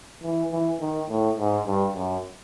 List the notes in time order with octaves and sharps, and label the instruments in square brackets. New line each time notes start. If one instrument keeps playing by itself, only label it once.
[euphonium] E3
E3
D#3
A2
G#2
G2
F#2